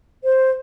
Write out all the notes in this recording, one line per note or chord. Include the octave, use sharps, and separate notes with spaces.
C5